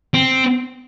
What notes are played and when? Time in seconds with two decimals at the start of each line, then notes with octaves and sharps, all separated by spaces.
0.14 C4